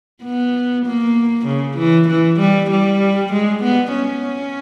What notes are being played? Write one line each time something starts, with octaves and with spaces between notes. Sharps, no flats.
B3
A#3
C#3
E3
E3
G3
G3
G#3
B3
C#4